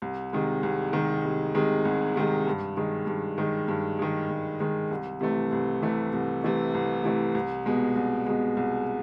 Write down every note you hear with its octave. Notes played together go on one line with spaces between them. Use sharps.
C2
C3 D#3 G#3
C2
C3 D#3 G#3
C2
C3 D#3 G#3
C2
C3 D#3 G#3
G2
D#3 G#3
G2
D#3 G#3
G2
D#3 G#3
G2
D#3 G#3
C2
C3 E3 A3
C2
C3 E3 A3
C2
C3 E3 A3
C2
C3 E3 A3
C2
B2 G#3
C2
B2 G#3
C2